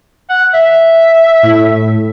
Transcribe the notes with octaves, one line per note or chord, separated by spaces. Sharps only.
F#5
E5
A2